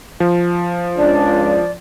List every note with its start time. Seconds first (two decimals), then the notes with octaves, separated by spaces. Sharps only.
0.20 F3
0.98 C#2 D4 D5